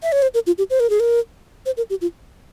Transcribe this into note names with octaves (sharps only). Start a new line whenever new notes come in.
E5
C#5
C5
A#4
F4
G4
C5
A#4
G#4
A#4
C5
A#4
G4
F4